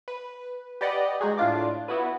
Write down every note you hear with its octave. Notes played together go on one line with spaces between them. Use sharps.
B4
G4 B4 D5 D#5 F#5
G#3 D#4 F#4 G#4
A2 D4 F4 D6
B3 E4 F#4 B4